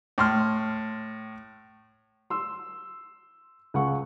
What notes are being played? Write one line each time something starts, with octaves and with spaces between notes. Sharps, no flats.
A2 C6 F6
C6 E6
C#2 F#5 C#6